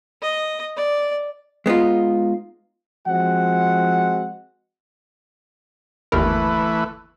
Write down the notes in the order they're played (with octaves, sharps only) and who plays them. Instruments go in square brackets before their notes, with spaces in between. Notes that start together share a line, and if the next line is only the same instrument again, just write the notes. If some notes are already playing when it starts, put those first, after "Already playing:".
[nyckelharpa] D#5
D5
[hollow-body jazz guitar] G#3 B3 D#4 F4
[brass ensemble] F3 G#3 C4 F#4 F#5
[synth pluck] G1 D#2 A#4 [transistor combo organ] E3 A3 B4